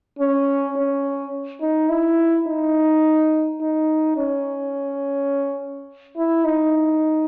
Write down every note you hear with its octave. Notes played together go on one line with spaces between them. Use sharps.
C#4
C#4
D#4
E4
D#4
D#4
C#4
E4
D#4